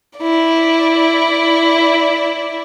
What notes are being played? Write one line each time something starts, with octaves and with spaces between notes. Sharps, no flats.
E4 D5